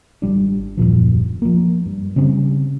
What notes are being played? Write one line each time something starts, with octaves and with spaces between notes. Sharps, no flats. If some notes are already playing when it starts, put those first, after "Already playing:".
G#1 G3 D4
D#1 F#2 A#2 F3
F3 A#3
G2
C#3 G3 C4 C#4